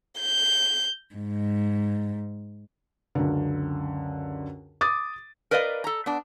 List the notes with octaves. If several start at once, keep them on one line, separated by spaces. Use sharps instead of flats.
G6
G#2
C#2 F#2 D3
D6 D#6 A6
A#4 B4 D5 D#5 F5
A4 A#5
B3 D4